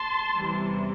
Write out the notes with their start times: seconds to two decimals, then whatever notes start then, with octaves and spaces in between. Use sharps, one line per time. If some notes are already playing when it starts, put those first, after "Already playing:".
Already playing: A5 C6
0.38 E2 C3 E3 G3